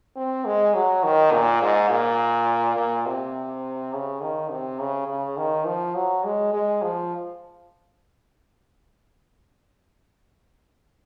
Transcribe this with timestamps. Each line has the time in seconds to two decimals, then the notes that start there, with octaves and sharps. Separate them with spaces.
0.17 C4
0.45 G#3
0.75 F#3
1.04 D#3
1.32 A#2
1.61 G#2
1.90 A#2
2.77 A#2
3.06 C3
3.93 C#3
4.22 D#3
4.51 C3
4.80 C#3
5.08 C#3
5.37 D#3
5.66 F3
5.95 F#3
6.24 G#3
6.53 G#3
6.82 F3